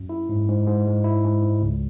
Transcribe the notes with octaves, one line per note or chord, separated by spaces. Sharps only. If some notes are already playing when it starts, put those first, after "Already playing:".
Already playing: F#2
E4
G#2
G#2
G#2
G#3
E4
G#2
G#2
C#2